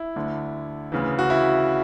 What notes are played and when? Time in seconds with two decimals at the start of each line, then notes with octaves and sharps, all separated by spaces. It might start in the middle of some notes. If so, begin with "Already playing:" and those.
Already playing: E4
0.16 D2 D3
0.92 D2 C#3 E3
1.19 F#4
1.30 E4